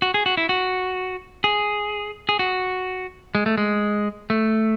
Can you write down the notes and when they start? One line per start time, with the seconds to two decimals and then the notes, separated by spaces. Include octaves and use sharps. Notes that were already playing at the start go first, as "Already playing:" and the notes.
0.02 F#4
0.14 G#4
0.26 F#4
0.37 E4
0.49 F#4
1.44 G#4
2.29 G#4
2.39 F#4
3.35 G#3
3.46 A3
3.58 G#3
4.30 A3